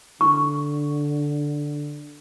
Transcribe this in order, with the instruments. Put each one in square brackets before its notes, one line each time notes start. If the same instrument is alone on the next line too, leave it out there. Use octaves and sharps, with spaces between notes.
[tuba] D3 [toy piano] C#6